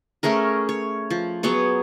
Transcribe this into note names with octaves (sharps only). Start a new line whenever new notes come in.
A3 C#4 G#4 A#4
C#5
F3
F#3 B3 G#4 C#5